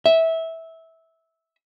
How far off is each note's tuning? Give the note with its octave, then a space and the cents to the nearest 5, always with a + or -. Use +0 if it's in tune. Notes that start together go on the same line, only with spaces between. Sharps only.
E5 -15